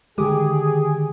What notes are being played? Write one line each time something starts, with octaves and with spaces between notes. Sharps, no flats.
D3 D#3 G#3 G4 G#4 D6 D#6